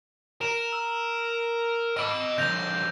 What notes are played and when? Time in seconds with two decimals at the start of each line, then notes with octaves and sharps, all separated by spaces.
0.41 A#4 E7
0.72 E6
1.97 D#5 B5 D6 E6 D7
2.38 D3 F3 G6 A#6 F7